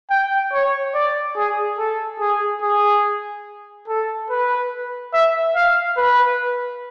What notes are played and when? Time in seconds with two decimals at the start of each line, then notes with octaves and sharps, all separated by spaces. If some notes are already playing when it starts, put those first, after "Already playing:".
0.10 G5
0.52 C#5
0.94 D5
1.36 G#4
1.78 A4
2.20 G#4
2.62 G#4
3.88 A4
4.30 B4
5.14 E5
5.55 F5
5.97 B4